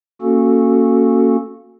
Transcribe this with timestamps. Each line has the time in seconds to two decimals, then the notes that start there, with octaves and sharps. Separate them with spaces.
0.22 A#3 C#4 F#4 A4